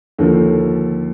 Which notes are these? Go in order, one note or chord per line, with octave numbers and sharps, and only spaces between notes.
D#2 D3 F3